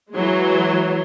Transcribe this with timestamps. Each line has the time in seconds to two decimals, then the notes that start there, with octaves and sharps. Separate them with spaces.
0.13 E3 F#3 G#3